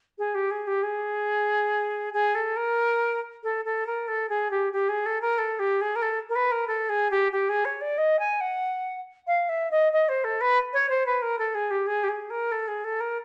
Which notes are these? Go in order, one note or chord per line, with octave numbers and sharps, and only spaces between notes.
G#4
G4
G#4
G4
G#4
G#4
A4
A#4
A4
A4
A#4
A4
G#4
G4
G4
G#4
A4
A#4
A4
G4
G#4
A#4
A4
A#4
B4
A#4
A4
G#4
G4
G4
G#4
C#5
D5
D#5
G#5
F#5
F5
E5
D#5
D#5
C5
A4
B4
C#5
C5
B4
A#4
A4
G#4
G4
G#4
G4
G#4
A#4
A4
G#4
A4
A#4